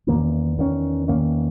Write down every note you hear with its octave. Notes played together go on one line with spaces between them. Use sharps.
E2 D#3 A#3 C#4
E2 D#3 A#3 C#4
E2 D#3 A#3 C#4